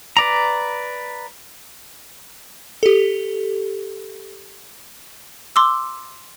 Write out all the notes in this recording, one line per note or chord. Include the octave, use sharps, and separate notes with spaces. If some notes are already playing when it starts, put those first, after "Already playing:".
B4 D5 A#5
G4 A4
C6 D6 E6